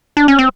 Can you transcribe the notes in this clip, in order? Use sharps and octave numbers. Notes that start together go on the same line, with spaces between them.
D4
C#4
C4